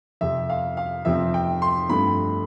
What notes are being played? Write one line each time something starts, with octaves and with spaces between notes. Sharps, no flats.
F2 C3 F3 C4 E5
F5
F5
F2 C3 F3 C4 E5
G5
C6
G2 F3 A3 C4 B5